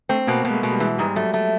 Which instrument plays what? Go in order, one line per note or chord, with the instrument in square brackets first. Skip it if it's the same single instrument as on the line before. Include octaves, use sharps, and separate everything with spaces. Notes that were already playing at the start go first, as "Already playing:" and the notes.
[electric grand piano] A3 [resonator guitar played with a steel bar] C4
[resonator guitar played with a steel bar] B2 [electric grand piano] A#3
[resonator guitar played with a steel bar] B2 [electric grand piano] B3
[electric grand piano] G#3
A3
[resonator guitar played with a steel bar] B2 [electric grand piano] G#3
[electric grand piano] G3
[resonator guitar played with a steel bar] E3 [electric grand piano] G#3
[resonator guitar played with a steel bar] G#2 [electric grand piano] G3
[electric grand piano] F#3 [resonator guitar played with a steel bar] A3
[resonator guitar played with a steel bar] A3